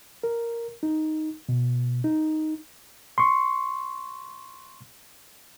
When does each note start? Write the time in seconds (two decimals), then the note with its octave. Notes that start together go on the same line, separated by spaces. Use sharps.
0.23 A#4
0.83 D#4
1.49 B2
2.04 D#4
3.18 C6 C#6